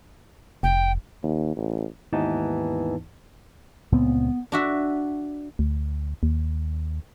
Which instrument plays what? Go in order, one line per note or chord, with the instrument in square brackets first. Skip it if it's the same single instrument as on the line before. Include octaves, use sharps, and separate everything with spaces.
[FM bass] F1 [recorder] G5
[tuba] D#2
A1
[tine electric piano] D#2 G#2 E3 B3 D#4 A5
[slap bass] C#2 A#2 C4 [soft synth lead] B3
[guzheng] D4 F#4 E5
[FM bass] D2
D#2